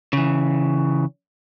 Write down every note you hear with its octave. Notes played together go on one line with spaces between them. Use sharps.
C#3 E3